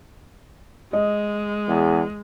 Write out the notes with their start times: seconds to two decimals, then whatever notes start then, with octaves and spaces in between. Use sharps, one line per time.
0.93 G#3 D#5
1.68 E2